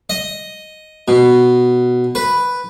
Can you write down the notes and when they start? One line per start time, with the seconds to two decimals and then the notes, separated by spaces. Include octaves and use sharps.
0.10 D#5
1.08 B2
2.15 B4